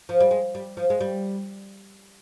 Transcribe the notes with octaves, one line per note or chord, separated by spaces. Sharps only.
F3
G3
G#3
G3
F3
G#3
G3